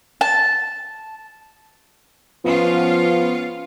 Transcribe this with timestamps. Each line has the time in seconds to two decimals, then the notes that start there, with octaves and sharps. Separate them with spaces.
0.21 A5
2.44 F3 B3 C#4 F4 F5